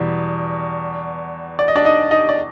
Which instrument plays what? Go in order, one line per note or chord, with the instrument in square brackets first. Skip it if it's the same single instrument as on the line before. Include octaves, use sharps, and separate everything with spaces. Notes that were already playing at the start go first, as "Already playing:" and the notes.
Already playing: [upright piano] E2 B2 G3
[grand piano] D5
D#5
D4 D5
D#4 D#5
D#4 D#5
D5